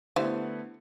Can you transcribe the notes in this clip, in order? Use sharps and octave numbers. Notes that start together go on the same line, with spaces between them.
D3 A3 B3 E4 G4 C5